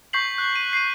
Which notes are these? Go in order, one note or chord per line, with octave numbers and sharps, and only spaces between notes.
C#6 G6 B6 C7 F#7
F#6
D#7
C7 D#7